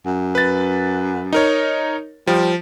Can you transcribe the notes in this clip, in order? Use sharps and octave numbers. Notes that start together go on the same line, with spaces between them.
F#2
B4 A6
D#4 A#4 C#5
F3 G3